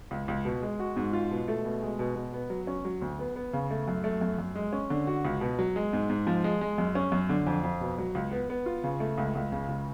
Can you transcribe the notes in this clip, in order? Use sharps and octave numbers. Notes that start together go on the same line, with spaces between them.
C#2
C#2
B2
G#3
F#4
G#2
F4
B2
A3
B2
G#3
B2
B2
B3
F#3
C#4
F#3
D2
B3
B3
C#3
A3
F#2
A3
F#2
F#2
G#3
C#4
D3
F#4
C#2
B2
F#3
G#3
G#2
G#2
F3
G#3
G#3
F#2
C#4
F#2
D3
F2
F2
B2
F#3
C#2
B3
B3
F4
C#3
A3
C#2
C#2
C#3
C#2